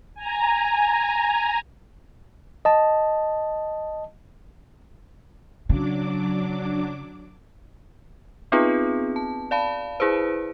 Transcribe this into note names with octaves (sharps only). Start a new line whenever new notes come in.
G#5 A#5
D#5 A5
C#3 F#3 D4 D6
B3 C4 D#4 F4 G#4 B4
A5
D5 F5 A5 B5
E4 G#4 B4 C5